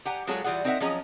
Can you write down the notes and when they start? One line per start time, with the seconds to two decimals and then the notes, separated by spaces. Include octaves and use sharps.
0.05 G4 F#5 G#5 A#5
0.27 F#3 G#3 F4 G#4 A4 C#5
0.44 E3 G3 F4 G#4 F#5
0.64 C4 D#4 A#4 C5 E5 F#5
0.80 F3 F#3 C#4 G#4 D#5 A#5